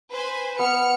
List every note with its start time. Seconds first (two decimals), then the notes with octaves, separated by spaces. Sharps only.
0.10 B4 C5 G#5
0.59 B3 F6 C#7